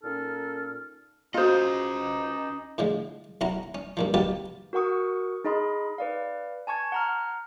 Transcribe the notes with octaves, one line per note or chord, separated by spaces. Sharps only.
A#2 C#4 D#4 A4 F6
C#4 D#4 F4 F#4 C5 D#5 F5
A2 D3 F3 G#3
B1 C#4 E4 F#5 A#5
C#4
G2 A#2 F3
B2 F#3 F4 G4 B4 A5
F#4 A#4 F#5 C#6 D#6
D#4 G#4 D#5 B5 C6
B4 D5 F5
G#5 A5 C#6 G#6
F#5 A#5 F6